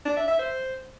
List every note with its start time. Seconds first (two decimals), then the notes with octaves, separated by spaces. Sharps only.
0.06 D4
0.17 E5
0.28 E5
0.39 C5